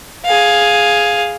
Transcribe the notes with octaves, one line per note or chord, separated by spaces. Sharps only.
G#4 F5